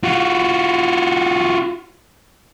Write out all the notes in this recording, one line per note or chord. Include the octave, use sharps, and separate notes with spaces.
F4 F#4